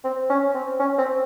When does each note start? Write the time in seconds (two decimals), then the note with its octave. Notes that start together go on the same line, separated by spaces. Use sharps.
0.04 C4
0.29 C#4
0.54 C4
0.80 C#4
0.98 C4